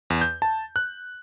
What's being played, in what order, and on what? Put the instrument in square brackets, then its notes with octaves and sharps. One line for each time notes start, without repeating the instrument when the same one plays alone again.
[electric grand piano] E2
G6
A5
F#6